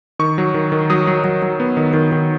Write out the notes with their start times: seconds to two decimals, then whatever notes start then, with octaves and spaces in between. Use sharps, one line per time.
0.19 D#3 C#6
0.38 F#3
0.54 D#3
0.72 D#3
0.90 F#3 D#6
1.07 F#3
1.24 F#3
1.42 F#3
1.60 B3
1.77 D#3
1.93 D#3
2.12 D#3